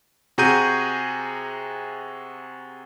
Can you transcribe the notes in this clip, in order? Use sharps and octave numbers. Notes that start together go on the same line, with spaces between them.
C3 F#4 G#4 A#5 G6 D#7